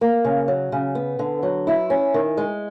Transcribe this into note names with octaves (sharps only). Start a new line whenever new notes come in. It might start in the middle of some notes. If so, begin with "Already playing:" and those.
A#3
C#3
F#3
C#3
B3
D3
F#3
E4
C#4
D#3
G#3